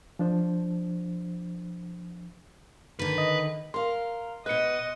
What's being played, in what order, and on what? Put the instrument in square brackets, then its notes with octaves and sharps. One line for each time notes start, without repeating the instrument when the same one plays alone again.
[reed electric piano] F3 D4 C5
[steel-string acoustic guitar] D3 D#3 [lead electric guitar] B4
[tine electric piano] D#5
[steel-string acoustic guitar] A#4 F5 [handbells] C6
[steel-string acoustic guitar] B2 B4 [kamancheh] D#5 [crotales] F#6 C#7